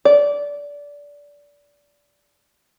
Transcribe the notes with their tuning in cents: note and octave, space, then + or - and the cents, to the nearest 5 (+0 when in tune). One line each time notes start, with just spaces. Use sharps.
D5 -20